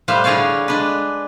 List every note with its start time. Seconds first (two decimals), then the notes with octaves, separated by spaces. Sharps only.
0.08 A2 G3 B4 C5 E5 F5
0.24 D3 G#4 B4 C#5 D5 F5
0.68 G#3 D4 B4